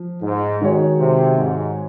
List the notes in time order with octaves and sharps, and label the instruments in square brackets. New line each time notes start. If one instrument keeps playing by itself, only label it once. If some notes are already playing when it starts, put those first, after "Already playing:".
Already playing: [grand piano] F3
[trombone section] G#2
[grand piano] D#3 G#3 D#4 F#4 C#5
[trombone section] C3
G#2